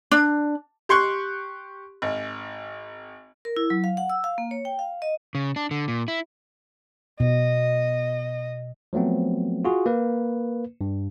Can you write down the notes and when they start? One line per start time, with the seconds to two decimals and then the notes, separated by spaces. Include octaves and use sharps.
0.11 D4
0.89 G4 C6 C#6 F#6
2.02 G#1
3.45 A#4
3.57 E4
3.70 F#3
3.84 F5
3.97 F#5
4.10 E6
4.24 F5
4.38 A#3
4.51 C#5
4.65 G5
4.79 F5
5.02 D#5
5.35 C#3
5.56 D4
5.71 D3
5.88 A#2
6.08 E4
7.20 B2 D#5
8.93 F3 F#3 A3 B3 C4
9.65 F4 F#4 G#4
9.86 A#3 B4
10.81 G2